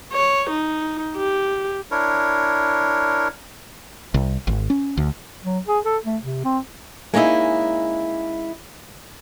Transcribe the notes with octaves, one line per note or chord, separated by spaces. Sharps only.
C#5
D#4
G4
D4 E4 A#4 C#5
C2
G#1
C#4
D2
F#3
G#4
A4
A3
C3
C4
G#3 A#3 C#4 D#4 E4